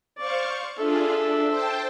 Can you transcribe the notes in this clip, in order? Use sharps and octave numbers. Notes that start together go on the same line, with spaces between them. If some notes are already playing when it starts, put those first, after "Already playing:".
C5 D5 F5 C#6
D4 F4 G#4 A4 E5
D4
C5 G5 A5